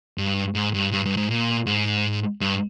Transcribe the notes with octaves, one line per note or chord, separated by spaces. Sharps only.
G2
G#2
G2
G2
G2
G#2
A#2
G#2
G2